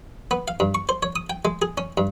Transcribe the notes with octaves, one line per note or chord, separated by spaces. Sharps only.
B3
F5
G2
C#6
C5
C#5
D#6
G5
G#3
G#4
C#4
G2